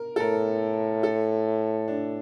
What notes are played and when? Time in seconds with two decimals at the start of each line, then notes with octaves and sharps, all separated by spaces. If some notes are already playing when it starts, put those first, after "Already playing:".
Already playing: A#4
0.16 A4
0.20 A2 A#4
1.03 A4
1.88 D4